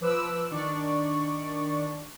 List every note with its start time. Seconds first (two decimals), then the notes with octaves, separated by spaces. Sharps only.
0.01 F3 B4 D6 E6 F#6
0.51 D#3 D4 D5 C#6